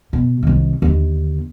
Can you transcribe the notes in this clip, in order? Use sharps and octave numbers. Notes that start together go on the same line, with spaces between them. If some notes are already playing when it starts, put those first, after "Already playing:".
B2
C2 D#3
D#2 D3